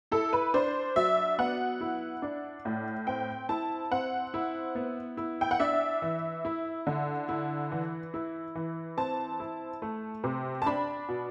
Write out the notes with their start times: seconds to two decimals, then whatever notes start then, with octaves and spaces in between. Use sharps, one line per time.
0.12 E4 A4
0.33 B4
0.54 D4 C5
0.96 F#3 E5
1.38 B3 F#5
1.81 E4
2.22 D4
2.65 A2
3.07 C4 G5
3.49 E4 A5
3.91 C4 F#5
4.34 E4
4.75 B3
5.17 E4
5.41 G5
5.51 F#5
5.60 D4 E5
6.02 E3
6.45 E4
6.87 D3
7.29 E4
7.72 E3
8.14 E4
8.55 E3
8.97 C4 A5
9.40 E4
9.82 A3
10.24 C3
10.62 A5
10.66 D4 B5
11.09 B2